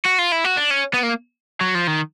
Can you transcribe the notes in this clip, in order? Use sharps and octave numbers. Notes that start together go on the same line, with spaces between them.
F#4
F4
E4
F#4
D4
C#4
B3
A#3
F#3
F3
D#3